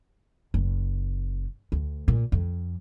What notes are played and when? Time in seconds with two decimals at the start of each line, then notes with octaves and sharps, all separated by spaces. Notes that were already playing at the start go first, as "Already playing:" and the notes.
0.54 F#1
1.72 D2
2.08 A#2
2.32 F2